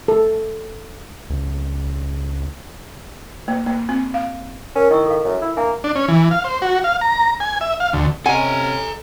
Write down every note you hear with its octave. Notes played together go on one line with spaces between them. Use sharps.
A4
C#2
A#3
A#3
C4
F5
C#4 A#4
D#3 E4 C#6 E6
A4 F5
F#2
E4
A#3 D4 E5 G#5
D4
C#4
E3
F5
C5
F#4
F5
A#5
G#5
E5
F5
D2
C3 C#4 A4 D#5 F#5 G#5 A#5